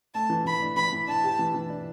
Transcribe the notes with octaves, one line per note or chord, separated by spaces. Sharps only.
A3 A5
E3
E3 B5
D4
E3 B5
E3
D4 A5
G4
E3
E3
D4